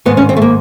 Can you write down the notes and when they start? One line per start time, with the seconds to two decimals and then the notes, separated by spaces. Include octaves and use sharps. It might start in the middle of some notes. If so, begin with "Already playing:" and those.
0.05 G#2 D#3 B3
0.17 C#4
0.29 C4
0.36 A3
0.42 A#3